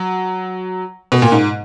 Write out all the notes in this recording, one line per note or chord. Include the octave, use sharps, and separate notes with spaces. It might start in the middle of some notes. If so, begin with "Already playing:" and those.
Already playing: F#3
B2
A#2
G#2